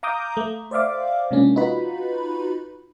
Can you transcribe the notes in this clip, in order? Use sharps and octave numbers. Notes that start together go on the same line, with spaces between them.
F5 A#5 D6 D#6 G6
A3
C5 D5 E5 F5 D6
C3 F3 G#3 A#3 C#4 D4
D#4 F4 F#4 B4 B5